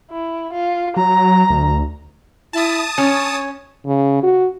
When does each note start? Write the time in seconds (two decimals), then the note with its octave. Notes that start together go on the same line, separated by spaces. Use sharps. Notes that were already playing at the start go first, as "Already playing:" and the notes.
0.11 E4
0.52 F4
0.97 F#3 A#5
1.50 D2
2.53 E4 A5 D#6
2.98 C#4 C#5
3.86 C#3
4.23 F#4